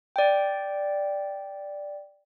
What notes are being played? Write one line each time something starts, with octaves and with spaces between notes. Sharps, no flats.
D5 G5